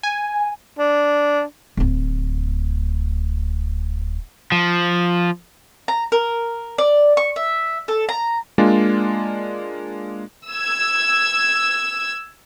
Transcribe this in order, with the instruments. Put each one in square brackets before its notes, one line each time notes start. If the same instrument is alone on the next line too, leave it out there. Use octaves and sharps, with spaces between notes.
[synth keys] G#5
[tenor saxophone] D4
[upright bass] D1 D2
[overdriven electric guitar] F3
[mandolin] A#5
A#4
D5
C#6
E5
A4
A#5
[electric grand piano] G#3 A#3 D4 F4 D5
[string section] E6 G#6